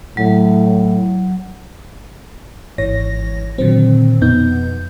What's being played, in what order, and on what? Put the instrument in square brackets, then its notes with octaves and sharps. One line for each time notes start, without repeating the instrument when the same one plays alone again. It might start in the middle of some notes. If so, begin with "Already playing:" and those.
[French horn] A2 [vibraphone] F#3
[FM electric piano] G#1 G#2 E3 C#5 A#6
A#2 D3 D#3 F#3 C4
F2 B2 B3 D#4 G6